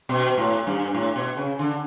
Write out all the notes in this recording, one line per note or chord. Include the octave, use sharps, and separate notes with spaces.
B2
A2
G2
A2
B2
C#3
D3